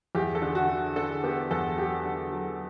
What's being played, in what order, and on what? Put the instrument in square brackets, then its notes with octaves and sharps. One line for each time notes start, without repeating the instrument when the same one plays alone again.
[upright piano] E2 G4
A4
D3
F#4
D3
D3 A4
B3 G4
E2 A4
F#3 G4
D3
F#3